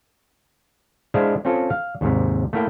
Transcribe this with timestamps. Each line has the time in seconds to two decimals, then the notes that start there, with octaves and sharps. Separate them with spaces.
1.14 G#3 D4 E4 C5 F5
1.45 C4 C#4 F4 A4
1.70 F5
2.01 D#2 G#2 C3
2.53 A3 A#3 E4 G5